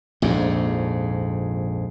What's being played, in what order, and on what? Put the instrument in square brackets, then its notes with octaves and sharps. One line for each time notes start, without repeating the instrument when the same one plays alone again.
[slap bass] A#1 F2 G#2